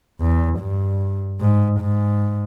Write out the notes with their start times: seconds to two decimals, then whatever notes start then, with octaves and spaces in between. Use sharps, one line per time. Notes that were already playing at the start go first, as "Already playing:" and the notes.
0.21 E2
0.60 G2
1.40 G#2
1.80 G#2